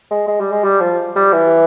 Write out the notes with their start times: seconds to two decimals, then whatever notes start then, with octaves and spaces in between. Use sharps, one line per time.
0.11 G#3
0.28 G#3
0.40 G3
0.52 G#3
0.64 G3
0.81 F3
1.16 G3
1.33 E3